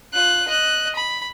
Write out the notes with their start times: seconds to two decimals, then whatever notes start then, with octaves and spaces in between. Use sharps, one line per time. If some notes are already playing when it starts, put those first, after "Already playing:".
0.14 F4 F#6
0.49 D#5 F#6
0.95 B5